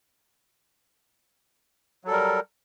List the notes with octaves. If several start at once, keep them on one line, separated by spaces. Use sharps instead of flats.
F#3 G3 A4 A#4